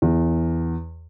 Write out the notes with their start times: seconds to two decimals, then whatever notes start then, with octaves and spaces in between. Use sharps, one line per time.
0.02 E2